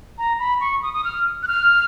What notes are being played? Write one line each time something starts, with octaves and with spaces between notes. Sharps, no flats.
A#5
B5
C#6
D#6
D#6
F6
F#6
F6